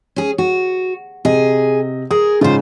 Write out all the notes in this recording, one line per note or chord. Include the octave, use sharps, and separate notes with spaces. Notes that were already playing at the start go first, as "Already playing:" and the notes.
C#4 G#4
F#4
C3 G#4 D#5
G#4 A#4 D#6
G#2 C#3 F4 C5